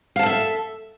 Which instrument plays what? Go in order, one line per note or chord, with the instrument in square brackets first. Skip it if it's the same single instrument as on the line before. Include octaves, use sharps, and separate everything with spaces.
[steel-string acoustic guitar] F5
A5
A4
E5